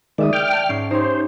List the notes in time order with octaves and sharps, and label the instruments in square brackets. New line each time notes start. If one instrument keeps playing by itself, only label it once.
[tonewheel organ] D#3 G#3 [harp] D5 E5 D#6
[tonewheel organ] G5 F6
[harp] A5
G#2 C#4 C7
[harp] D#4 G4 C#5 [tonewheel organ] C5